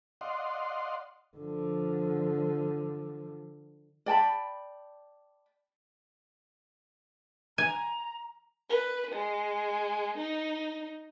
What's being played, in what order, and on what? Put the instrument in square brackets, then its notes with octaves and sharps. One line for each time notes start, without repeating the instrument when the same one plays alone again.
[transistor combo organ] D5 D#5 F5 F#5 C6
[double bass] D3 F3
[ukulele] D5 G5 A5 B5
[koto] G#5 [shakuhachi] A#5
[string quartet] B4
G#3
D#4